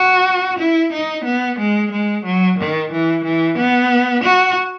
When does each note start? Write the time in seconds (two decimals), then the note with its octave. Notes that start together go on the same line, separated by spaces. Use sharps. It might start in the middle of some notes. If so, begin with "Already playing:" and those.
Already playing: F#4
0.58 E4
0.92 D#4
1.25 B3
1.58 G#3
1.92 G#3
2.25 F#3
2.59 D#3
2.92 E3
3.24 E3
3.58 B3
4.24 F#4